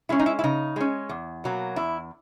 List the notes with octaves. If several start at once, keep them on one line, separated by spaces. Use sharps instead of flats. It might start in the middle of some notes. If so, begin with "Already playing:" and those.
G#3 C#4 E4
D#4
E4
E4
C#3 D#4
G#3 C#4
E2
B2 F#3 A#3
E2 E4